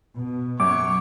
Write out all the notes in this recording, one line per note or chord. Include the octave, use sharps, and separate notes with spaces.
B2
F#2 C#5 C#6 D6